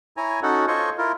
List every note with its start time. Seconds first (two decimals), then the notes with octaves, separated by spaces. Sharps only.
0.17 E4 C#5 G#5 A#5
0.43 C#4 D#4 F#4 A4 F#5
0.68 F4 A4 C5 C#5 D#5 C#6
0.98 E4 F4 A#4